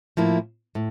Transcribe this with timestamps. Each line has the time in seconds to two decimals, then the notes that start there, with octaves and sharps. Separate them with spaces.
0.17 A2 F3 A#3 E4
0.75 A2